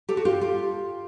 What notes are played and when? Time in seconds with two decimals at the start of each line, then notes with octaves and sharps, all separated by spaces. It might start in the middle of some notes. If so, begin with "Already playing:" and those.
0.09 G4 A4
0.17 F#4
0.25 F4 G4
0.41 F4 G4